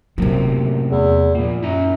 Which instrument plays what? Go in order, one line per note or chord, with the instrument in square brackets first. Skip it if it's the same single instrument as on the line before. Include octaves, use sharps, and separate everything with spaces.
[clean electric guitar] F#2 A2 A#3 [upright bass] C3 F#3
[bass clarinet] E2
[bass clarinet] A#2 [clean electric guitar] F3 A#3
[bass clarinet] F#2 [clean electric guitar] E4 A#5